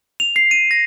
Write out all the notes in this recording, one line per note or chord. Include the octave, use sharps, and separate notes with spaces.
F7
C7
D#7
A#6